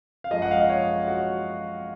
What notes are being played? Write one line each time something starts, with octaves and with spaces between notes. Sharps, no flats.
F5
F#2 F3 G#3 D#5
F#5
F5
D#5
C#5
F#4